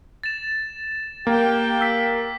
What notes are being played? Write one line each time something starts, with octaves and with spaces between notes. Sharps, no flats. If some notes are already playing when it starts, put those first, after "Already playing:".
A6 E7
A#3 G4 G5
E6 B6